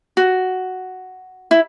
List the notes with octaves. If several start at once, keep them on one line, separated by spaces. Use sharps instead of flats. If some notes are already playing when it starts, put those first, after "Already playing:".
F#4
E4